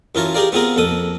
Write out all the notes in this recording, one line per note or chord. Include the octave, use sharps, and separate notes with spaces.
F#2 E3 F4 A#4 C#5 A5
G4 G#4 A#4 D5 F5
B3 C4 F4 G#4 A#4
F2 A#2 A4 D#6